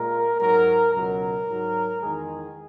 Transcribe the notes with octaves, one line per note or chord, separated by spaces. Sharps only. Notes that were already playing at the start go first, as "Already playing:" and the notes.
Already playing: A#2 G#3 A#4
G#2 F#3 A#4
C#2 B2 F#3 A#4
G#2 F#3
E2 D#3 G#3 G#4